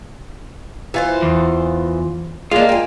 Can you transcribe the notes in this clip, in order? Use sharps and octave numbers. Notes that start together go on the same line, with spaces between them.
E3 F4 C5
E2
G#3 A#3 D4 F4
G5 G#5